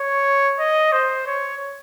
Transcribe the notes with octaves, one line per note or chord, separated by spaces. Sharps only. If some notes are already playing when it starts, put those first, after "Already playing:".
Already playing: C#5
D#5
C5
C#5